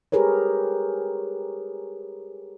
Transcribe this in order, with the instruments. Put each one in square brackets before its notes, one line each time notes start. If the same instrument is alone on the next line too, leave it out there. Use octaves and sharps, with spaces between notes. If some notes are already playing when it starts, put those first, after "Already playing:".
[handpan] G4 G#4 A#4 B4 C#5